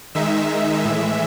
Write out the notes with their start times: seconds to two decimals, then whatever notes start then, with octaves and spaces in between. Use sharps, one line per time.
0.15 D#3 G#3 D#4 E5
0.84 A2 E3 G#3